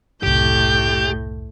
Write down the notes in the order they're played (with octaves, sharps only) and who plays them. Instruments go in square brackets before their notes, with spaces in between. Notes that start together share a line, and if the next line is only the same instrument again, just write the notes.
[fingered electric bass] F#1 C2 [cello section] A2 [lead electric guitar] G4 [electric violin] G6